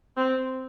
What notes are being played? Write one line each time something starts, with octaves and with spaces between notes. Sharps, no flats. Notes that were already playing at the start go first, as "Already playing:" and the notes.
C4